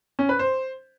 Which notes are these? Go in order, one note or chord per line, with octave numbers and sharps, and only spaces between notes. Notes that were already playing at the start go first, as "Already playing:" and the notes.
C#4
B4
C5